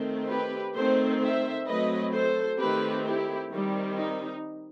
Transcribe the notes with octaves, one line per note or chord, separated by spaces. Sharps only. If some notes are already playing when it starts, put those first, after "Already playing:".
Already playing: D#3 A3 C4
G4 B4
D#3 A3 C4 A4 C5
C5 E5
F#3 A3 C4 B4 D#5
A4 C5
D#3 A3 C4 G4 B4
E4 G4
D#3 G3 C4
D#4